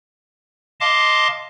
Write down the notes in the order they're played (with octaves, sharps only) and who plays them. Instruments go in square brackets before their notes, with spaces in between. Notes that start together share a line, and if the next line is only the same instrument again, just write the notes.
[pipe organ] D#5 F5 A5 C6 D6